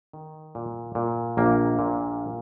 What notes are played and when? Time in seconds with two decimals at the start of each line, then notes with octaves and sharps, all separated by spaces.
0.13 D#3
0.55 A#2
0.95 A#2
1.37 A#1 A#3
1.79 A#2